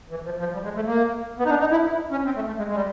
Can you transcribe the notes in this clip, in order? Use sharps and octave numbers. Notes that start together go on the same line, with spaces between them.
E3
F3
F3
G3
G#3
A3
A#3
B3
D#4
D4
D#4
E4
C#4
C4
A3
A3
G#3
G#3
G3